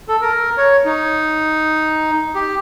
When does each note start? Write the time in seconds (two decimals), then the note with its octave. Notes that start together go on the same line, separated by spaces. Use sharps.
0.08 A4
0.21 A#4
0.57 C#5
0.85 D#4
2.35 G4